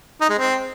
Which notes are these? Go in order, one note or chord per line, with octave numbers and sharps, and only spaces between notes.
D#4
G#3
C4